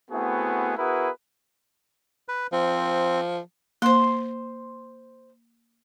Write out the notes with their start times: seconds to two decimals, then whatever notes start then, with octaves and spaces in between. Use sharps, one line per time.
0.11 A3 B3 C4 E4 F#4 G#4
0.77 B3 E4 F#4 G#4 A#4 B4
2.28 B4
2.52 F3 C4
3.82 A#3 C5 C6